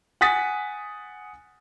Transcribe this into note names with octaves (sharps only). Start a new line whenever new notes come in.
F#5 G#5 D#6 A6 B6